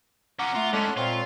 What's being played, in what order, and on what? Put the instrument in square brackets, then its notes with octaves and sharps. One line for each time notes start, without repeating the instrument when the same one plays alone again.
[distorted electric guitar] C#4 F4 [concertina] F#5 A#5 D6
[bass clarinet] A3 [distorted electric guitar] F4
[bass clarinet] G#3 [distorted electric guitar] C#4 D4 [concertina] A4 C6 F#6
[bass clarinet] A#2 [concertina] C4 C#5 C#6 [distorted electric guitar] F4